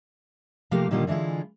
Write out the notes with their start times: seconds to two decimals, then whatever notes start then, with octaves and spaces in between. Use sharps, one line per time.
0.71 C3 F3 A3 A#3 G4 F5
0.91 A#2 D3 D#3 G3 A#3 F4
1.07 D3 E3 G#3 E4 F4